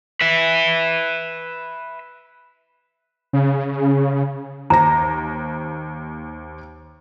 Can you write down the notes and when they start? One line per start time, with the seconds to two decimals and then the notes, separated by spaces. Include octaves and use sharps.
0.21 B4 E5
3.33 C#3
4.70 D#2 C5 A#5 A#6